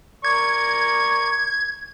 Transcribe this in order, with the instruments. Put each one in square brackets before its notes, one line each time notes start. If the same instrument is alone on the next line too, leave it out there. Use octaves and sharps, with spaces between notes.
[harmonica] A#4 D5 C#6 [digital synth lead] G#6